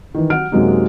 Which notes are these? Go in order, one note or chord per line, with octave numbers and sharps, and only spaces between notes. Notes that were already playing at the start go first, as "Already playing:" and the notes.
D#3 E3
F#3 F#5 F6 D7
F#2 C3 F#3 G#3 A#3 D#4